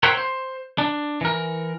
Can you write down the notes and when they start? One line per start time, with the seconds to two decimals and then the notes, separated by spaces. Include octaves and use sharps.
0.03 A#4 C5 C#5 E5 F#5 G5
0.17 C5
0.78 D4
1.21 E3 A#4